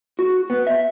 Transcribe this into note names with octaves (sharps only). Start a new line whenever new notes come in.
F#4
B3
E5